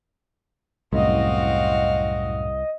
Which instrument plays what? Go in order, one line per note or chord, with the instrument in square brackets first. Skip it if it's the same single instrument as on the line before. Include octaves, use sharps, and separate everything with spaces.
[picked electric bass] C2 [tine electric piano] F#2 A2 [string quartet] C4 F#4 F5 [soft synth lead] D#5